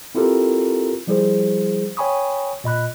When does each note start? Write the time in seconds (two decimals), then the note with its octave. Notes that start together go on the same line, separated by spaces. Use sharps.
0.15 C4 E4 F4 G4 A4 A#4
1.07 F3 G3 E4 G#4 C5
1.97 C#5 G5 G#5 B5 C#6 D#6
2.64 A#2 D#5 B5 F#6